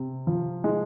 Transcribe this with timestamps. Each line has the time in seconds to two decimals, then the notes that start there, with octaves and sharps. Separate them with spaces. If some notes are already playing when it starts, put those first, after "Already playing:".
Already playing: C3
0.27 F3
0.64 G#3